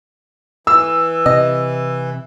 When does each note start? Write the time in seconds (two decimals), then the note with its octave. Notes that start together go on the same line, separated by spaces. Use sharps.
0.67 E3 E6
1.26 C3 D#5